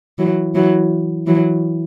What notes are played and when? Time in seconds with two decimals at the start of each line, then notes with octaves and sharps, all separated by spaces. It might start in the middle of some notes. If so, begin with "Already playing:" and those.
0.18 E3 F#3
0.55 E3 F#3
1.27 E3 F#3